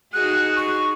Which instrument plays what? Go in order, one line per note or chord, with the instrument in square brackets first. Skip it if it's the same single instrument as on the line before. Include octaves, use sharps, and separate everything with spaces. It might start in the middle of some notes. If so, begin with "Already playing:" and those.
[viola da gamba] D#4 F#4 G#4 [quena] F#6
[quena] C#6